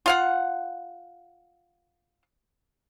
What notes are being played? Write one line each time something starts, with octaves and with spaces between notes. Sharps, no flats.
F4 F5 F#5